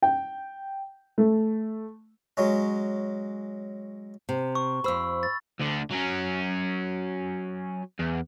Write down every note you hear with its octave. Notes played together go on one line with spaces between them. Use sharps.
G5
A3
F#3 G#3 C#4
C3
C#6
F2 C5 B5 E6
A6
D2 D3
F#3 C#4
E2